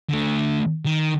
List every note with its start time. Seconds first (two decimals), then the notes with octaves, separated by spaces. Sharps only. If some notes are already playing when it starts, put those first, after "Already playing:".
0.10 D3 A3
0.85 D#3